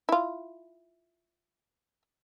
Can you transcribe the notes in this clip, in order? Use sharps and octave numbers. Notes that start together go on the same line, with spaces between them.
E4 F4